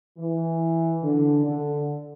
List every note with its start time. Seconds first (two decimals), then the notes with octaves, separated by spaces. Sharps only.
0.18 E3
1.03 D3
1.45 D3